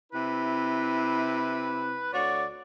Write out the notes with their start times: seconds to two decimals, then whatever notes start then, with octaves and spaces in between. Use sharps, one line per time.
0.13 C3 E4 B4
2.13 D2 F#4 C#5 D5